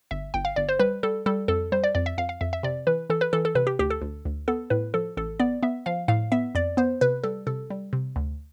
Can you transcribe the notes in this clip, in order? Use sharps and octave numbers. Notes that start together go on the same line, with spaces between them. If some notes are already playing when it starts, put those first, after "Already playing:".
G1 E5
G1 G5
F5
G1 D5
C5
G3 B4
G3 A4
G3 A4
F2 A4
G3 C5
D5
F2 D5
E5
F2 F5
F5
F2 E5
E5
C3 D5
E3 B4
E3 A4
B4
E3 A4
A4
C3 B4
G4
D2 G4
A4
D2
D2
B3 A4
A2 B4
F3 A4
A1 A4
B3 D5
B3 E5
F3 F5
A2 F5
B3 E5
F2 D5
B3 C5
C3 B4
G3 A4
C3 A4
G3
C3
D2